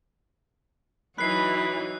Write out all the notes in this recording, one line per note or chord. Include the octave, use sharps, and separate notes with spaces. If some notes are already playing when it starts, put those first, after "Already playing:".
E3 F#3 D#4 B5 F#6 C7